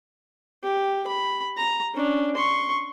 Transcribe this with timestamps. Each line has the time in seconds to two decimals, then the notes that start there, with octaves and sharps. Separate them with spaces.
0.64 G4
1.07 B5
1.58 A#5
1.94 C#4 D4
2.36 C6 C#6